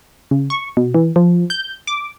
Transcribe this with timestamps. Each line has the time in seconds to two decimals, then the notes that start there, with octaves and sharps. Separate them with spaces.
0.31 C#3
0.50 C#6
0.77 B2
0.94 E3
1.16 F3
1.50 G6
1.87 D6